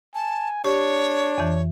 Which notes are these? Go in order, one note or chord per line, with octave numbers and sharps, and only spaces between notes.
G#5 A5
D4 G4 C#5 C#6
F2 E3